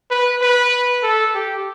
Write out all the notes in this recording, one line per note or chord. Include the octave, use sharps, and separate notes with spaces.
B4
B4
A4
G4